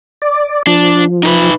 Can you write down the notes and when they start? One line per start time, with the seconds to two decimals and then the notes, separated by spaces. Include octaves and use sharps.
0.22 D5
0.67 F3 D4
1.23 D#4 A#4 B4